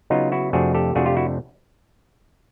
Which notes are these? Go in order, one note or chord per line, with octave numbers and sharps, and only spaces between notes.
C#3 F#3 B3 D#4 F4
E4 F#4
F2 C3 F3 A3 D4 F#4 G#4
G4 A4
F2 C3 F3 A3 D4 F#4 G#4
F4 G4
E4 F#4